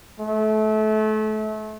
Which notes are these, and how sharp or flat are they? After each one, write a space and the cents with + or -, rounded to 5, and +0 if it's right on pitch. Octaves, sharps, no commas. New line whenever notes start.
A3 -30